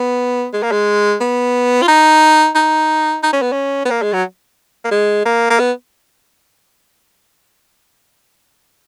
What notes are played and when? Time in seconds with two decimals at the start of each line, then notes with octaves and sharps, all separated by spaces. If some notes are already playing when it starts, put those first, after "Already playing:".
Already playing: B3
0.53 G#3
0.63 A#3
0.72 G#3
1.20 B3
1.82 F4
1.88 D#4
2.55 D#4
3.23 D#4
3.33 C#4
3.42 B3
3.52 C#4
3.85 B3
3.91 A#3
4.02 G#3
4.13 F#3
4.84 A#3
4.91 G#3
5.26 A#3
5.50 A#3
5.59 B3